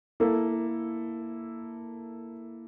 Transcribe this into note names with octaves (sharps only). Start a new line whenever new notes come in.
A#3 E4 A4